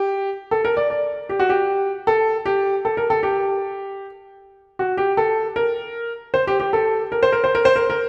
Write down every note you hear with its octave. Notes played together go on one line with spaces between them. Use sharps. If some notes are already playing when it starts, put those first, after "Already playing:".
Already playing: G4
A4
A#4
D5
D5
G4
F#4
G4
A4
G4
A4
A#4
A4
G4
F#4
G4
A4
A#4
C5
G4
G4
A4
A#4
C5
A#4
C5
A#4
C5
A#4
A#4